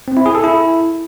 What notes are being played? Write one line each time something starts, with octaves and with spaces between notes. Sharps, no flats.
C4
E4
G#4
A4
E4